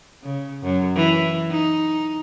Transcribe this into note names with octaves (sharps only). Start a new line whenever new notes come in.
C#3
F#2
E3
D#4